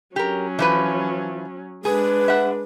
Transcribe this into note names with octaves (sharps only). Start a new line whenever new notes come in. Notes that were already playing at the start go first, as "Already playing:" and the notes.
F#3 C#4 G4 A#4
E3 F3 B4
G#3 D4 G#4 B4
E5 F#5